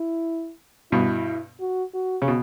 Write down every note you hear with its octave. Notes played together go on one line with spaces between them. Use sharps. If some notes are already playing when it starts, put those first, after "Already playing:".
Already playing: E4
G2 B2 E4
F#4
F#4
C#3
B2